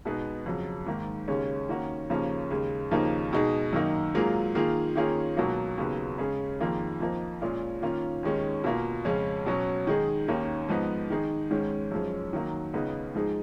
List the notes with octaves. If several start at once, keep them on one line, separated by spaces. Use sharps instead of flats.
B2 G#3 B3 D#4 G#4
F2 C#3 F#3
G#2 D#3 A#3
D#2 C#3 G#3 C#4
D#3 A#3 C#4 F#4
D#2 C#3 F3 A#3 C#4
D#2 C#3 G#3
D#2 C#3 F3 A#3 D#4
B2 G#3 D#4 G#4
F#2 D#3 A#3 D#4
G#2 F#3 A#3 F4 G#4
D#3 A#3 F4 G#4
D#3 A#3 C#4 F4 G#4
C#2 B2 F#3 A#3
D#2 C#3 F#3 B3
C#3 G#3 C#4 G#4
F2 D#3 A#3 F4 G#4
F2 F3 A#3 D#4
A#2 G#3 C#4 F4 G#4
D#3 A#3 C#4 F4
D#2 D#3 G#3 C#4
B2 A#3 F4
F2 C#3 G#3 C#4
B2 F#3 C#4
D#3 G#3 D#4 G#4
D#2 D#3 A#3 C#4
G#2 F3 B3 D#4
D#3 G#3 D#4 G#4
G#2 D#3 G#3 C#4
F#2 F3 G#3 C#4
D#3 F#3 A#3
C#2 C#3 G#3 B3 D#4
G#2 F3 G#3 D#4 G#4